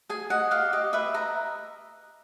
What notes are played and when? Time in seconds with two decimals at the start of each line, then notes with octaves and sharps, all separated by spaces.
0.09 G#4 G#5
0.30 D#5 F#5
0.51 G4 F5
0.72 G4 D#5
0.93 B4 E5
1.14 D#5 A#5